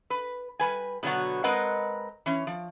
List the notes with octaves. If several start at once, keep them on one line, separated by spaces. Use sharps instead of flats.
B4
G3 B4 G#5
B2 D3 F#3 B3 F#4
G#3 C4 A#4 B4 D#5 F#5
E3 C#4
F3